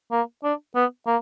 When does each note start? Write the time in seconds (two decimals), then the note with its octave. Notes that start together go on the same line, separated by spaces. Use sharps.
0.12 A#3
0.44 D4
0.75 B3
1.07 A#3